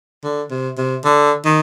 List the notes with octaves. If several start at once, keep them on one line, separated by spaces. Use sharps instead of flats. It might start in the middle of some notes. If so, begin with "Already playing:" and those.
D3
C3
C3
D3
D#3